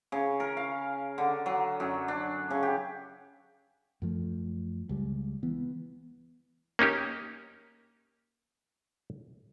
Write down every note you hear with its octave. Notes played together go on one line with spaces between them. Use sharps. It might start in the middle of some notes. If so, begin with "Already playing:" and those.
C#3
A#4
F5
D3
F#3
F#2
D4
C#3
G4
F#2 F3 A3
C#2 G3 G#3
E3 B3
A#3 C#4 D#4 G4